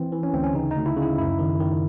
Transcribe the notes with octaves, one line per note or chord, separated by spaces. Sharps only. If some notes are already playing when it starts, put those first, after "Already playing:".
Already playing: E3 C4
E3
C#4
D2 C4
C#4
C#3 D#4
D#4
D2
E4
C#3
E4
F#2 E4
D#3
D#3